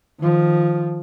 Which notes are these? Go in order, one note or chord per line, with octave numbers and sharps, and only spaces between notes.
D#3 F3